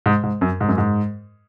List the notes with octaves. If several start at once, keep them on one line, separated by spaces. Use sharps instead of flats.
G#2
G#2
F#2
G#2
F#2
G#2